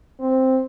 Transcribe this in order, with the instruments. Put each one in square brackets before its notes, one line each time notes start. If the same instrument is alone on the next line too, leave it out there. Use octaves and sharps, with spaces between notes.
[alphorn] C4